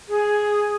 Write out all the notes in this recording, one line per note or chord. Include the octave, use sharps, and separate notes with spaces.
G#4